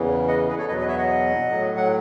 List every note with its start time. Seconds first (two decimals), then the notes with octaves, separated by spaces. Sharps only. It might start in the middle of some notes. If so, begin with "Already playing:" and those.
Already playing: E2 C#3 E3
0.28 D#5 F#5
0.48 G#4 B4
0.58 A4 C#5
0.68 E2 B2 F#3 B4 D#5
0.78 B4 D#5
0.88 C#5 E5
0.98 D#5 F#5
1.49 A2 F#3
1.77 F#5